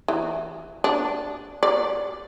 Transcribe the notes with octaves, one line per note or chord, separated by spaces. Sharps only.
E3
D4
D5